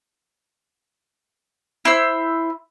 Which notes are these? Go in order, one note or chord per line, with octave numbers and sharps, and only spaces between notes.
E4 C5 E6